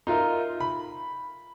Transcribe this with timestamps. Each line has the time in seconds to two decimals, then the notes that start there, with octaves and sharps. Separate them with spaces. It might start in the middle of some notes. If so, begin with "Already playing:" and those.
0.07 D#4 F4 A#4 E5
0.60 B5